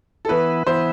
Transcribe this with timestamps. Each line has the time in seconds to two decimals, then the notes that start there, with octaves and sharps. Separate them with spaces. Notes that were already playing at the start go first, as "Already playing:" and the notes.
0.25 A4
0.29 E3 B3 E4 B4
0.67 E3 B3 E4 C5